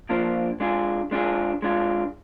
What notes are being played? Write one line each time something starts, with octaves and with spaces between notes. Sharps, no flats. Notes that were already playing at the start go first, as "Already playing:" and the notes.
F3 A#3 D4 F4 C5
G#3 D4 F4 G#4
G#3 D4 F4 G#4
G#3 D4 F4